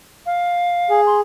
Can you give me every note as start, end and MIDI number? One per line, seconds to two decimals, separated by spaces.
0.26 1.01 77
0.90 1.21 68
1.06 1.17 84